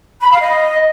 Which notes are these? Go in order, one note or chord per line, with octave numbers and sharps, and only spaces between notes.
B5
F5
D#5